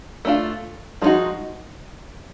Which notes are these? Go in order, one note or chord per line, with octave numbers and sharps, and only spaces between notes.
A3 D4 F4
F3 G#3 B3 D#4 F#4